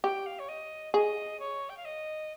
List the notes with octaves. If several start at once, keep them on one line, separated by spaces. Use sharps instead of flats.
G4 G5
F5
C#5
D#5
G#4 D#5
C#5
G5
F5
D#5